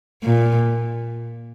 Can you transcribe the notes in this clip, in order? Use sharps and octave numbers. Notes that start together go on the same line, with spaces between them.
A#2